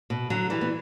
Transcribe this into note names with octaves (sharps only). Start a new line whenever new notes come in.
B2
D3 F#3
E3 G3
B3